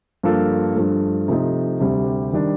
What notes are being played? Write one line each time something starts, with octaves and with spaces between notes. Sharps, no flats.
G2 F3 A#3 F4 A4
G2 F3 A3
C3 F3 A3 D#4
D2 C3 G3 C4 G4
D#3 G3 D4